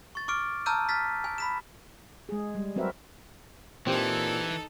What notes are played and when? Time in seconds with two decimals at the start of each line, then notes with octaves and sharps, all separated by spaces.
0.15 C#6 A6
0.28 C#6 D6 F6 D7
0.66 A5 A#5 E6 F6 G6 D#7
0.89 F6 A6 B6
1.24 G#5
1.38 B5 B6 E7
2.29 G#3 G#4
2.55 G3
2.76 F#3 C4 F#4 A#4 B4 E5
3.87 A#2 E3 C4 D#4 G4 A4 C5